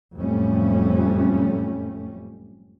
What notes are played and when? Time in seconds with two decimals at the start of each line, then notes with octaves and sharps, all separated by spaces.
0.17 F#1 F2 A2 G3 A3 C#4